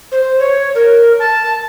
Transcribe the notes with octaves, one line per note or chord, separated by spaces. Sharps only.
C5
C#5
A#4
A5